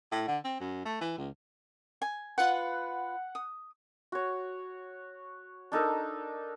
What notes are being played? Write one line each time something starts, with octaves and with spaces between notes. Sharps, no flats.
A2
D3
C4
F#2
A3
E3
C#2
G#5
F4 B4 F#5
D#6
F#4 C#5
D4 D#4 A4 A#4